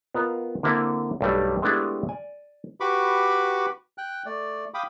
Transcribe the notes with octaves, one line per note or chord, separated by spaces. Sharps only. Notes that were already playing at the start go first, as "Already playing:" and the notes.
B3 F4 A#4 D#5 A#5
D3 A#3 C4 E4 A4
B1 G2 G3 A3
G#3 A3 B3 D4 E4 G4
D5 G#5
F#4 G4 B4 B5 C#6 D6
G5 F#6
A3 D5
F5 G5 B5 D6 D#6